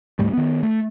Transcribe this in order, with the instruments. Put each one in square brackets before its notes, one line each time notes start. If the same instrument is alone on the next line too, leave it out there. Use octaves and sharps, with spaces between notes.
[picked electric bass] D2 G#2 G3 A3
D#3 B3
A3